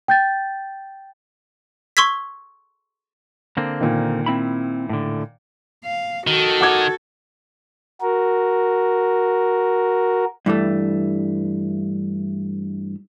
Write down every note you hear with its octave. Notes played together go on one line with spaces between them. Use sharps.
G5 G6 A6
C6 C#6 E6 G#6 B6
D3 A#3 C4
A#2 D#3
C4 E4 B5
A2 D3
F5
D#3 F#4 A4
F#5 D6 G#6
F#4 A#4
G2 E3 G3 A3